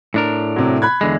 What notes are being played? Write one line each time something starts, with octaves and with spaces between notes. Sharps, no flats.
A2 D4 A#4
C3 F#3
B5 F#6 G#6
E2 D3 G#3